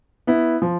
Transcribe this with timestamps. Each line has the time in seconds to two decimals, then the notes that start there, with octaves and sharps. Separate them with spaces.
0.27 B3 E4
0.62 F3